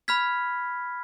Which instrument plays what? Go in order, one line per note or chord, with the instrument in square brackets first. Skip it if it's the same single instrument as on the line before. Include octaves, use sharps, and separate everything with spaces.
[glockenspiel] B5 F6 G#6 B6